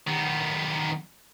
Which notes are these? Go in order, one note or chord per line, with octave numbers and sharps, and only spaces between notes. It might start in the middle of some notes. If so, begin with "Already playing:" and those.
D#3 B3